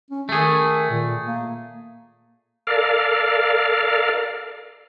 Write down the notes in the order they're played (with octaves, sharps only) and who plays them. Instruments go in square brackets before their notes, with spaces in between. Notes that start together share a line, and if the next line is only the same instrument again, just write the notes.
[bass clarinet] C#4
[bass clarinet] D#3 [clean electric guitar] A3 G#4
[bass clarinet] A#2
A#3
[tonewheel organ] A4 A#4 D5 F5